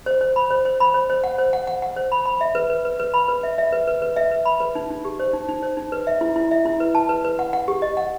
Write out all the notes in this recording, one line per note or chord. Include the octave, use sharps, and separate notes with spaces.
C5
C5
B5
C5
C5
B5
C5
C5
F#5
C5
F#5
F#5
F#5
C5
B5
B5
E5
B4
B4
B4
B4
B5
B4
E5
E5
B4
B4
B4
E5
B4
B5
B4
D#4
D#4
G4
C5
D#4
D#4
C5
D#4
B4
E5
E4
E4
E5
E4
B4
A5
B4
B4
F#5
F#5
G4
D#5
F#5